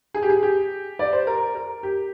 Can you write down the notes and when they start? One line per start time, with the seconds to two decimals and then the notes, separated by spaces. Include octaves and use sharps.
0.14 G#4
0.23 G4
0.30 G#4
0.43 G4
0.99 D5
1.13 C5
1.27 A#4
1.55 A#4
1.83 G4